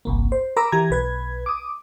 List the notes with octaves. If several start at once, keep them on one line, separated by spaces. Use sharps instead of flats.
G1 C2 A#3
C5
A#4 A#5 B5 D6 E6
E3 G4 A#5 G#6
B1 B4 G#6
D6 D#6